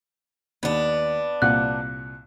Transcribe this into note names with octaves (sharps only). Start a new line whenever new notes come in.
D#2 B3 D4
C2 A#2 F#5 F#6